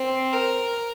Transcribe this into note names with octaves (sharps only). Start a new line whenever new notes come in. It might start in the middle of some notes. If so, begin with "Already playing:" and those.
Already playing: C4
A#4